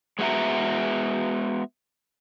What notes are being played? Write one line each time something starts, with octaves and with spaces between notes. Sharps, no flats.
G#3 B3 F#4 E5 A#5